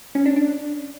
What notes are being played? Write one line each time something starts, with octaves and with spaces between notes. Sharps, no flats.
C#4
D4
D4